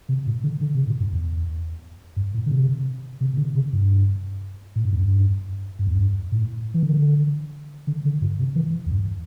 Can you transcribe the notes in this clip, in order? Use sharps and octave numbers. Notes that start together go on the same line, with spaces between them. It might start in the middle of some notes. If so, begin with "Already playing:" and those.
C3
A2
D3
D3
C3
A2
G2
E2
G2
A2
D3
C3
C3
C3
D3
C3
G2
A2
G2
E2
G2
G2
E2
G2
A2
E3
D3
D3
D3
G2
C3
E3
E2
G2